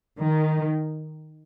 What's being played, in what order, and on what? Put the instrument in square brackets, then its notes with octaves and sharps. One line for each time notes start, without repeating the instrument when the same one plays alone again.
[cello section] D#3